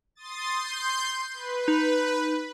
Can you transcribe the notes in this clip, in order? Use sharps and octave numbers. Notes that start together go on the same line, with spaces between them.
C6 D#6 A6
C6 G6
B4
D#4